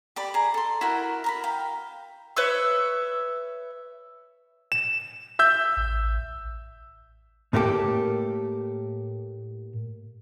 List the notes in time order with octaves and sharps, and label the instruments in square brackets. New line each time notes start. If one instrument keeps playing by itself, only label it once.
[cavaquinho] G4 D5 B5
G#4 A#5
A4 C6
E4 F#4 A#4
A#4 A#5 B5
F5 G5
[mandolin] B4 C#5 E5 E6
[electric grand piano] E7
E5 E6 G6
[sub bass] A1
[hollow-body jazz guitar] A2 A3 A#3 D#4 G4 A4